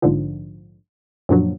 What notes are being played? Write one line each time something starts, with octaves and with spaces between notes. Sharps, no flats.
A#1 G#2 D3 F3
F#2 A#2 D3 F3 F#3